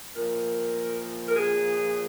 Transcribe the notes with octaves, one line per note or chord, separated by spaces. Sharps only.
A#2 F3 A#4
A#4
G#4